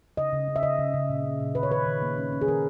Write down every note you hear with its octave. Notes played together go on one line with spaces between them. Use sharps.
C#3 D#5
C#3
C#4
E5
C#3 D#5
C#3
C#3
A#2
C#4
A#2
D#3 B4
C#5
D#3 B4
D#3
A#3
C#4
C#4
G#4
D#3 A#4